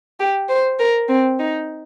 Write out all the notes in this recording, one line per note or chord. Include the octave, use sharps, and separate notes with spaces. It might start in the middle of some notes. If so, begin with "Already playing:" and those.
G4
C5
A#4
C4
D#4